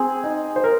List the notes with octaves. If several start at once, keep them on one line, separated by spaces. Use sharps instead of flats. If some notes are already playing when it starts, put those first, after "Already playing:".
Already playing: C4 G#4
D#4
C5
A#4